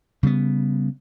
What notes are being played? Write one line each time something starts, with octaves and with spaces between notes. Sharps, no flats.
C#3 G3 A3 B3